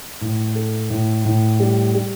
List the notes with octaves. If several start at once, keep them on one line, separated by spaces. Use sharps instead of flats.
A2
A4
A2
A2
G3
G3